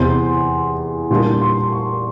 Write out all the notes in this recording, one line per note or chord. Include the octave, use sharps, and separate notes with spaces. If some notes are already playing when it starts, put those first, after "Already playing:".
Already playing: E2 C3 E3 C6
A#2 G3 A#3 D4 C6
C6
C#6